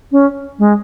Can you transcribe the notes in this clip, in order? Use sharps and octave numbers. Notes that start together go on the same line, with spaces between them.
C#4
G#3